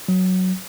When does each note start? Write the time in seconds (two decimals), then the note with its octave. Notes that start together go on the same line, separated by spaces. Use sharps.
0.08 F#3